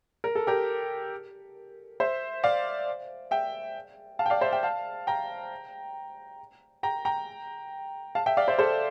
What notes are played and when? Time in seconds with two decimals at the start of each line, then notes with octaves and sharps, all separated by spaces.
0.24 A#4
0.35 A4
0.47 G4 A#4
2.00 C5 E5
2.44 D5 F5
3.31 E5 G5
4.19 F5 A5
4.26 G5
4.30 D5 F5
4.41 C5 E5
4.53 E5 G5
4.63 F5 A5
5.07 G5 A#5
6.83 G5 A#5
7.05 G5 A#5
8.15 F5 A5
8.26 E5 G5
8.37 D5 F5
8.48 C5 E5
8.59 A4 C5